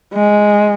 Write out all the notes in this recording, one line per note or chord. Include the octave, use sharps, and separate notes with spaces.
G#3